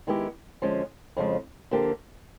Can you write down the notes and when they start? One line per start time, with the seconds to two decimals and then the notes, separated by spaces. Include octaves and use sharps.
0.07 D#3 G#3 B3 E4 G4
0.62 D3 F3 G#3 C#4
1.17 F2 C#3 F3 G#3
1.71 D3 F3 A#3 D4 G4